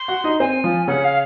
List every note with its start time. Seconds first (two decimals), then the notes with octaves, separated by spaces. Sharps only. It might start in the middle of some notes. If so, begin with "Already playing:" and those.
Already playing: C6
0.08 F#4 F#5
0.24 D#4 D#5
0.40 C4 C5 G#5
0.64 F3 F4
0.88 C#3 C#4 F#5
1.04 F5